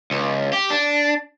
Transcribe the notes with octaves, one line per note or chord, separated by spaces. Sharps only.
C#2
G4
D4